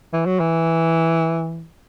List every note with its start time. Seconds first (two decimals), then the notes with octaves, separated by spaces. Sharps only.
0.13 E3
0.26 F#3
0.40 E3